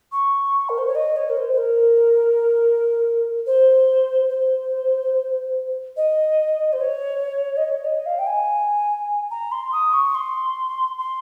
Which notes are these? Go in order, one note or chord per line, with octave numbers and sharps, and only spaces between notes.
C#6
A#4
C5
C#5
D#5
C#5
A#4
C5
C5
A#4
C5
C5
D#5
C5
C#5
D#5
C#5
D#5
F5
G5
G#5
A#5
C6
D#6
C#6
C6
C6